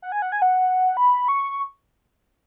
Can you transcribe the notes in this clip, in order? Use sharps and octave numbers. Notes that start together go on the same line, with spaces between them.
F#5
G#5
F#5
G#5
F#5
B5
C#6